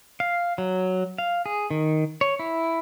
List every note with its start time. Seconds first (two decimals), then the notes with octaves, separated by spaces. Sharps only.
0.20 F5
0.58 F#3
1.18 F5
1.46 G#4
1.70 D#3
2.21 C#5
2.39 E4